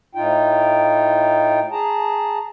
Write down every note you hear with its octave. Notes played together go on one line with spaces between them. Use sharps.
A2 D#4 F4 G5
G#4 A5 A#5